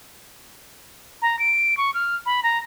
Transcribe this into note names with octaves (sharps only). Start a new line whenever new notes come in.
A#5
D7
C#6
F6
B5
A#5